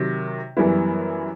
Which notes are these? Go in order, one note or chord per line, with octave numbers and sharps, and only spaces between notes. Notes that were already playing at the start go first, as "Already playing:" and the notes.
Already playing: C3 D#3 F#3
F#2 E3 G3 B3 E4